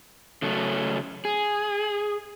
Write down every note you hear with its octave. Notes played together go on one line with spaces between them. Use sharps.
C#3 F#3 A3 C#4
G#4